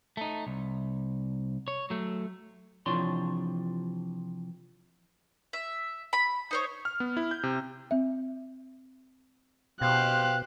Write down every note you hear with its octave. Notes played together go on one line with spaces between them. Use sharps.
A3 D#4
C2
C#5
F#3 A3
C3 E3 F3 D4 C#5 C6
E5
B5
D#4 C5 C#5
F6
B3
E4
G6
C3
C4 E5
B2 G4 C5 F5 F#6